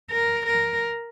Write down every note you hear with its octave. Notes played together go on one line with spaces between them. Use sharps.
A#4
A#4